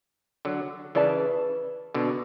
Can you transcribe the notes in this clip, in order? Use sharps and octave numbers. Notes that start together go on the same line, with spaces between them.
D3 F#3
C#3 E3 B4 D5 A5
B2 D3